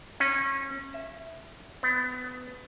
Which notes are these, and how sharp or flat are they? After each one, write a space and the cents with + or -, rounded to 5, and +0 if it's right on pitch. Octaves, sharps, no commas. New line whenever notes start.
C#4 -25
E5 +0
B3 +30